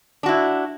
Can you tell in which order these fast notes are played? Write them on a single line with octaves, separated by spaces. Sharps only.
D4 F#4 E4